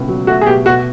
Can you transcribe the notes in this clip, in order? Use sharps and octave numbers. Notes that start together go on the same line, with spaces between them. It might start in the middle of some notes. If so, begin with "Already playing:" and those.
Already playing: C#2 B2 A3
F#3
A3 F#4
G#4
B2 G4
B2 F#4